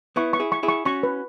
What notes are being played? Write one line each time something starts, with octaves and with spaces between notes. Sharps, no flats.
B3 E4 C#6
C#6
E4 G#4
C#6
E4 G#4
C#6
C#4 F#4 C#6
B4